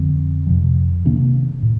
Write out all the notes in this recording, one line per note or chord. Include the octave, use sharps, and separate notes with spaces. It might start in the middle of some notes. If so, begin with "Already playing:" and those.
Already playing: F2 D3 F3 C4
F2 C3 F3
C3 D#3 A#3 D4
A2